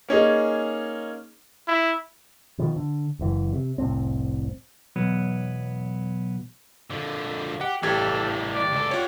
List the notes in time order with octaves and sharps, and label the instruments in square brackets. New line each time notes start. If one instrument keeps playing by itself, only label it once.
[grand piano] A#3 C#4 D#4 G#4
[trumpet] E4
[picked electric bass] B2 D#3 F3
D3
F#1 F#2 E3
C3
F1 C2 A2 C4
[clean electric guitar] B1 E2 F#3 B3
[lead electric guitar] D3 F3
[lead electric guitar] G4 [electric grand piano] F#5
[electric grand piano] A1 G4 G#6 [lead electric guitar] E3 G3 [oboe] A4
[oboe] D5
[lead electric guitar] C#2 A4
[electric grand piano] F4 C#5 [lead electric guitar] G4 F#5